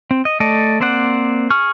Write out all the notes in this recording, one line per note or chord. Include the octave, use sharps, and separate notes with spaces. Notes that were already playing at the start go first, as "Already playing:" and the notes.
C4
D#5
A3 A4 D5 D#5
A#3 C4 C5 D5 F#5
G#4 C#6 F6